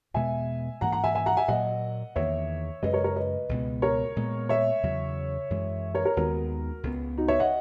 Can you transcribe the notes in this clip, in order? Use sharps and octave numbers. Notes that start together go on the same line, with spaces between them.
E2 B2 G#3 B3 E5 G#5
G#2 E3 A#3 F#5 A#5
F#5 A#5
E5 G#5
E5 G#5
F#5 A#5
E5 G#5
A#2 F#3 A#3 D#5 F#5
E2 D#3 A#3 C#5 E5
F#2 C#3 G#3 B4 D#5
A#4 C#5
A#4 C#5
B4 D#5
C#2 B2 G#3 B3
A#4 C#5
A#2 G#3 B3
C#5 E5
E2 C#3 F#3
F#2 E3 G#3
A#4 C#5
A#4 C#5
D#2 D#3 G#3 B3 F#4 A#4
C#2 C#3 F#3 B3
D#4 F#4
C#5 E5
D#5 F#5